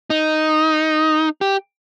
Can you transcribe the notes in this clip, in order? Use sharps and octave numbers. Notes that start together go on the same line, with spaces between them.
D#4
G4